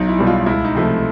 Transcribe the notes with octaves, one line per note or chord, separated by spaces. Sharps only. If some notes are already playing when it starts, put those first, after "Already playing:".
Already playing: B1 D#4
E4
B2 G3
F4
C#2 E4
D#4
C3 F3 A3